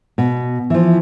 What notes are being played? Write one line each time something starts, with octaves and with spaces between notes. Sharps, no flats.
B2
E3 F3